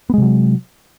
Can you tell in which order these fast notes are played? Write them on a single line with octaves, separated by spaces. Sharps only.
B3 G#3 C3 F#3